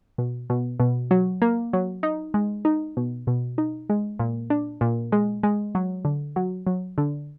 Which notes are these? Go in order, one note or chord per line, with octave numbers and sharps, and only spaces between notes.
B2
B2
B2
F#3
A#3
F#3
D#4
G#3
D#4
B2
B2
D#4
G#3
A#2
D4
A#2
G#3
G#3
F#3
D3
F#3
F#3
D3